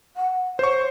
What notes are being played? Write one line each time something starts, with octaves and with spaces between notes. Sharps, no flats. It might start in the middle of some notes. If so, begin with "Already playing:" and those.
F#5
C5 C#5 C#6